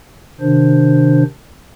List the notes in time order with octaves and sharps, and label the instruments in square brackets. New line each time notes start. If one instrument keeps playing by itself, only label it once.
[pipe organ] C3 D#3 D4 C5